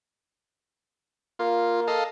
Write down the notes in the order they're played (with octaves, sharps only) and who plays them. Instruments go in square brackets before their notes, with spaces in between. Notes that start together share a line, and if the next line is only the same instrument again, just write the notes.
[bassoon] A#3 [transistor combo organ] F4
[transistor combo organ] A4 D#5 F5